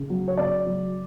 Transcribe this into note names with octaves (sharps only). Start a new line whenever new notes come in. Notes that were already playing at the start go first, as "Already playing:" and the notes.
Already playing: C#3
F#3
C#5
C#3 D5
F#3